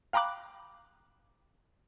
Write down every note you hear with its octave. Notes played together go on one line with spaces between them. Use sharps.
F5 G5 A#5 B5 D6 F#6